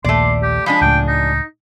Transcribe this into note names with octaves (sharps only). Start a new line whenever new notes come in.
A#1 D#2 A#2 A3 D5 C6
G4
F3 G#3 D4 B5
C#2 A2 G5
D#4